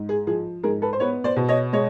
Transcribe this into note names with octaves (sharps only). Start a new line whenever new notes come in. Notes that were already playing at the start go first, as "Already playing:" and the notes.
Already playing: G#2
G#4
F3 G#4
G#2 G#4 A#4
A4 B4
C5
B3 B4 C#5
C5 D5
B2
C#5 D#5
G#3 C#5 D#5